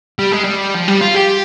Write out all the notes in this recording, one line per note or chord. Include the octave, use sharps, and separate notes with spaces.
G3
G#3
G3
F3
G3
F4
G4